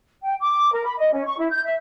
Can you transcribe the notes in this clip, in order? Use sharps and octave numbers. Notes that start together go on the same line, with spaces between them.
G5
D6
A#4
B5
D#5
C#4
C#6
E4
G6
E5